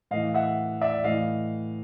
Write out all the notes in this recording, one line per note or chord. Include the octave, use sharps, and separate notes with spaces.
A2 E3 D#5 F5
E5 F#5
D5 E5
A2 E3 D#5 F5